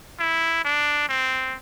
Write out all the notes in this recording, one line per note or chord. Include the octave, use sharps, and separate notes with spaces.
E4
D4
C4